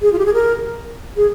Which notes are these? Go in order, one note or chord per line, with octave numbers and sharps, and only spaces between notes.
G#4
F4
G4
G#4
A#4
G#4